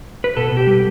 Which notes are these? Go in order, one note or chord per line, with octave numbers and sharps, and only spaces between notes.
B4
B2 A4
B2
G4
G3